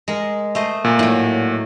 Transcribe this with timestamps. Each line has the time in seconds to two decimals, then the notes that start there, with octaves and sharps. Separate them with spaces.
0.08 G#3 A#4
0.55 A3 C5 D#5
0.85 A#2
0.99 A2 F#3